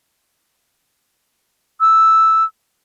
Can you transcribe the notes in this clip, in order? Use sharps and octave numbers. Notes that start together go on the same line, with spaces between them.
E6